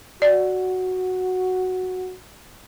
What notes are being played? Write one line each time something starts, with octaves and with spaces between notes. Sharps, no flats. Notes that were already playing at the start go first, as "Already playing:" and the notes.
F#4 D5